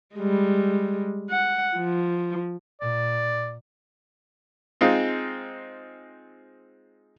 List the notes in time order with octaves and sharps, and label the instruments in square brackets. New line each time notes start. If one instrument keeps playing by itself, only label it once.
[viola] G3 G#3
F#5
F3
[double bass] A#2 [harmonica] D5
[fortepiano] G#3 C4 D#4 F4